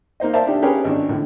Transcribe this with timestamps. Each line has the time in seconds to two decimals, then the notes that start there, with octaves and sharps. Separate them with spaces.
0.20 A#3 D#4 C5 D#5
0.33 A#4 C5 D5 E5 F5 A5
0.47 D4 D#4 G4
0.62 C#4 G4 G#4 A#4 B4 C#5
0.84 G#1 D4
1.09 A2 D3